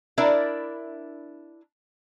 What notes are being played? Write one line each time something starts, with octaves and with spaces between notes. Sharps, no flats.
D4 E4 A#4 D5 E5